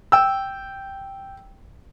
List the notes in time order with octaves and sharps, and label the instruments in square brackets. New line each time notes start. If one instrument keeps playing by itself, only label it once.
[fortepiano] G5 E6